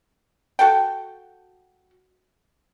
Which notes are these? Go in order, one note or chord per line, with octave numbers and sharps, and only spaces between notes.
F#4 A4 G5